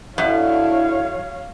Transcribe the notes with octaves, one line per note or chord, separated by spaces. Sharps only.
F#2 D3 E4 C#5 F5